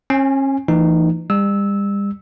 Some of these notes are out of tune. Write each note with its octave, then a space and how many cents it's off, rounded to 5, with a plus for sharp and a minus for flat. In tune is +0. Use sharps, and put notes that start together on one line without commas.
C#4 -40 G#5 +0
E3 +20 A3 +40 D#4 -20
G3 +40 E6 -15